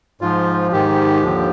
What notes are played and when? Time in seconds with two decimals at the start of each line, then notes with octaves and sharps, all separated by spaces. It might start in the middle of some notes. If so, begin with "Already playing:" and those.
0.21 G#2 F3 F4
0.72 G#2 D#3 G4
1.23 D#2 D3 F3